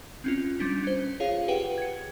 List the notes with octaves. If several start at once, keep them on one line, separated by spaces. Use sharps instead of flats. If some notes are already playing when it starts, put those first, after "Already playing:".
C4 C#4 F4
G3 C#4 D4 B6
C#4 C5
F4 G#4 C#5 F5
G4 G#4 B4 F#5 G5
G#6 C#7